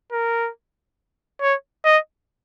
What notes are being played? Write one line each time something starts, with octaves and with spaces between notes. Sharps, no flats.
A#4
C#5
D#5